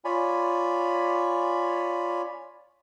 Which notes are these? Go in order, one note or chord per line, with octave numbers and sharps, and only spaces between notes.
F4 C#5 D5 G#5 B5